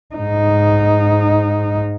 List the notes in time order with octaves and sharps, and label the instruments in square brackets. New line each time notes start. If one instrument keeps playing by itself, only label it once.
[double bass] G#2 D#4